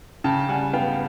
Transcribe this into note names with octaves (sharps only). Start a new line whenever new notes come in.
C#3 G5 A5
G3 F#5 G#5
B3 F5 G5